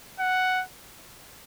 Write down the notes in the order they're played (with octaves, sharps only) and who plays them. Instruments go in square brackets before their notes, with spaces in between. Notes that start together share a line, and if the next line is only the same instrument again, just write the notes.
[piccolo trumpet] F#5